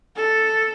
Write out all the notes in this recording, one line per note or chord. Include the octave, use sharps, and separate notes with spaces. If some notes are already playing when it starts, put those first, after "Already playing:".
A4